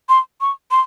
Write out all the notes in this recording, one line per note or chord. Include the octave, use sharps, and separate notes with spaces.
C6
C#6
C6